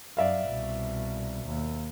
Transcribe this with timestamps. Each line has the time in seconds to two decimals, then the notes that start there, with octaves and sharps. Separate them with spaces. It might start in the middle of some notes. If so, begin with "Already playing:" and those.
0.17 F#2 D5 E5 F5
0.47 C2 B2
1.45 D#2